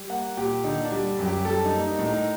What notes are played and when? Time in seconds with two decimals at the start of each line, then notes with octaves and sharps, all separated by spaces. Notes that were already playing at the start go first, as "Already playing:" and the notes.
Already playing: G3
0.09 A#3 F#5
0.37 A#2 G4
0.64 D3 D#4
0.85 D4
0.92 G3
1.19 F#2
1.25 G4
1.45 G3 A4
1.65 D#4
1.72 A#3
1.86 D#4
1.99 A2
2.06 D#4